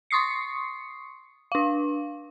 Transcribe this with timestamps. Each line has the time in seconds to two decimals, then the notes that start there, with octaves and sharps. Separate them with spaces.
0.11 C6 C#6 D#6 C7 C#7
1.52 D4 F5